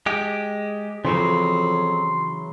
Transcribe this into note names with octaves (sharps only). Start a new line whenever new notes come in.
G#3 G4
F2 C#3 E3 F#3 C6